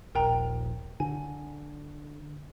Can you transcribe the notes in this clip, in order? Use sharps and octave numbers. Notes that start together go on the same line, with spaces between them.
D#1 A#1 A#4 G5 A#5
D3 G#5